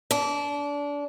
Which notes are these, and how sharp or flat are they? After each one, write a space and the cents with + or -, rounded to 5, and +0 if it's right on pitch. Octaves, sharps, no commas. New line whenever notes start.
D4 -25